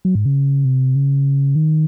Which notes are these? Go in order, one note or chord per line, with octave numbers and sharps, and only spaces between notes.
F#3
G#2
C#3
C3
C#3
D#3